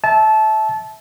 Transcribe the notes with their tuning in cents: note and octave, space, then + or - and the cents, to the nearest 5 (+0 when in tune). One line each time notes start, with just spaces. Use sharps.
E5 -15 A5 -20